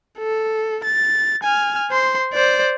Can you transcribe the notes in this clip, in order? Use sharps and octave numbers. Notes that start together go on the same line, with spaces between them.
A4
A6
G#5 F6
C5 C6
C5 D5